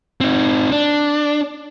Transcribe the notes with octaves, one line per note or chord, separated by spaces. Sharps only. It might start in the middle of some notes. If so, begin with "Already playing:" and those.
C4 D#4
D4